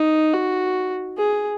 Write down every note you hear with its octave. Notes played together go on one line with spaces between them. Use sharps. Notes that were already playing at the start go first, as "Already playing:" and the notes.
Already playing: D#4
F#4
G#4